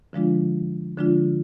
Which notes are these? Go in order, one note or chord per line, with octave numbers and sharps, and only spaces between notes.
D3 F3 G#3 D4 F4
D3 F3 G#3 D4 F4